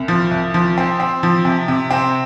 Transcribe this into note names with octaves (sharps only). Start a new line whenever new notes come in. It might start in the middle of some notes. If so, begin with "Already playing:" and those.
Already playing: C2
F3
C2
F3
C4
C4
F3
C3
C3
C4